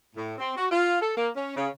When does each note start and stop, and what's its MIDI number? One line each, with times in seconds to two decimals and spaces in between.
0.16 0.34 45
0.38 0.52 60
0.56 0.65 66
0.70 1.00 65
1.00 1.13 69
1.16 1.29 58
1.35 1.54 61
1.56 1.68 49